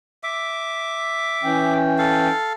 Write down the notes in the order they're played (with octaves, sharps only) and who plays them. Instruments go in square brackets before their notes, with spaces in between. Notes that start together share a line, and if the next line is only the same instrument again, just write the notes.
[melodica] E5 D6
[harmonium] E3 C#4 G5
[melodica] A4 F5